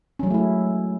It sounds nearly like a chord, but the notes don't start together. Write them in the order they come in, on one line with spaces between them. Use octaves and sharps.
C#4 F#3 G#3 A3 E4